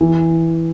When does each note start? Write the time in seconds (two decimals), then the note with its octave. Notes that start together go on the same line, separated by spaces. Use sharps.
0.01 E3